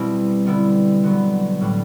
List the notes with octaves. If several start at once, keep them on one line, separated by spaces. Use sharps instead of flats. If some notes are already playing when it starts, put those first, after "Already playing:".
Already playing: B2 G3 C4 E4
D3 G3 B3 E4
D3 F#3 B3
A2 G3 D4